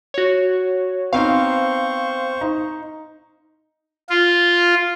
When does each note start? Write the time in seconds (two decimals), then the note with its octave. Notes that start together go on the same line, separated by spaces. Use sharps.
0.14 F#4 C#5
1.13 B3 C4 D#4 C5 F5 C#6
2.41 D#4
4.10 F4